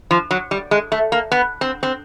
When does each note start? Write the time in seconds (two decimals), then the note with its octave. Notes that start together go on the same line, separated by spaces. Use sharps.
0.11 F3
0.31 F#3
0.51 G3
0.71 G#3
0.92 A3
1.12 A#3
1.31 B3
1.61 C4
1.83 C4